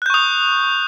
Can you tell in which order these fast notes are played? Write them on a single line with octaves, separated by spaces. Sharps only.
F#6 G6 C#6 D#6